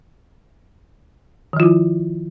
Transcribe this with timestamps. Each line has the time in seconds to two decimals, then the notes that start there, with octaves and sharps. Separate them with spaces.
1.53 D#3
1.56 F3
1.60 F4
1.63 E4